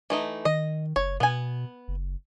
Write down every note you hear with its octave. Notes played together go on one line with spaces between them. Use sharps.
E3 A3 D#4
D#3 D#5
F#1 C#5
B2 B3 G#5
F#1